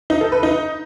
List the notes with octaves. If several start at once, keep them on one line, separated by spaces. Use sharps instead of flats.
D#4
A4
B4
D#4